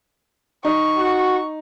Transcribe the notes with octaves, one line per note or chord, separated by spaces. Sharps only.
D#4 C#6
F#4